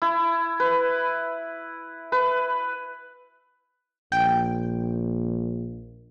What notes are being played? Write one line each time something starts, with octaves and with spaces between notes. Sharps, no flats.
E4
B4
B4
A#1 G5